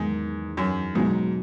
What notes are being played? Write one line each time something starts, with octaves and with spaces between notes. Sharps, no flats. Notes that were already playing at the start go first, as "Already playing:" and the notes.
Already playing: E2 G#2 D#3 F#3 B3 D#4
F#2
G#2 B2 F#3 B3 D#4